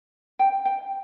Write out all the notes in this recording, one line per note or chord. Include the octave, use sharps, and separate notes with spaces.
G5
G5